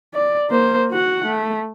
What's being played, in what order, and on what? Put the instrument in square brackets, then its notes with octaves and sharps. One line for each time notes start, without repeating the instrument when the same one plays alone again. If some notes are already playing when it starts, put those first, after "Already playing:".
[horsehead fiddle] D5
A#3 C5
F#4 F#5
A3